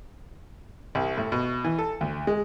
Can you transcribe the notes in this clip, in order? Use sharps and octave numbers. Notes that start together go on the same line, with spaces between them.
C2
A2
B2
E3
A4
D2
G#3